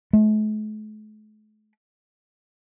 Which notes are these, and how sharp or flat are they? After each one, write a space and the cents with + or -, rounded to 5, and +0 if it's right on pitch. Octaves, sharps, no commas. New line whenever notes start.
A3 -45